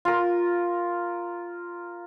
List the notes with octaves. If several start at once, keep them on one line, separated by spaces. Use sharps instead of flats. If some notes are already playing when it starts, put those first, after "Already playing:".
F4 A#4